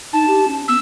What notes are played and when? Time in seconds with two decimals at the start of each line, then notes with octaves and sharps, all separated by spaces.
0.13 D#4 A5
0.28 G4
0.48 C#4
0.68 B3 E6